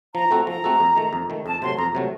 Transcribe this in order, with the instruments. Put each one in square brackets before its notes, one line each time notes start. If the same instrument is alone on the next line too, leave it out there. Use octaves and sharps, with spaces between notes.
[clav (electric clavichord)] F3 [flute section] A#5
[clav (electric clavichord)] A3 C4 F#4 A4
[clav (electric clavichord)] F3 [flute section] A#5
[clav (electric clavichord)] A3 C4 F#4 A4
F2
D#3 A3
F2
D#3 A3
[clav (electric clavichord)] F2 [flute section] A5
[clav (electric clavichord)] C3 F#3 A3 [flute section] C6
[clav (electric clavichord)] F2 [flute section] A#5
[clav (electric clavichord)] C3 F#3 A3